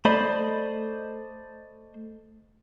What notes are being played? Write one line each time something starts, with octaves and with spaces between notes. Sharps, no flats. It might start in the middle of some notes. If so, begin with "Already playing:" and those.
A3 C5 D5 D#5 B5